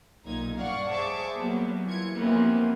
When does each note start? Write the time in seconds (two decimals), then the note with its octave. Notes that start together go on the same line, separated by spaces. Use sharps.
0.24 B1 A#2 D#4 G#6
0.57 G2 D5 F5 F#5 C#6
0.91 G#4 C5 E5 A5 C#6 D6
1.39 F#3 G3 A#3 B3
1.86 E3 F4 G#6 C#7
2.16 C3 E3 F3 A#3 B3 C#4